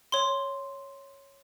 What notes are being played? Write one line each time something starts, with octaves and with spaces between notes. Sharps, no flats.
C#5 C6